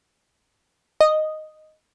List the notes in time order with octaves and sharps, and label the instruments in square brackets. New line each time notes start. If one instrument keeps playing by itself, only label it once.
[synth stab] D#5